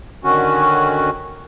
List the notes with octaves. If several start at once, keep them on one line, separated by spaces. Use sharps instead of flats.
D3 D#3 C#4 F#4